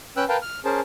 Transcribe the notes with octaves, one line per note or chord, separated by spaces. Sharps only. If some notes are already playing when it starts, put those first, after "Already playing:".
C#4 B4 G5 E6 F#6
A#4 B4 F5 G5 A5
F6
C#4 G#4 A#4 C5 A5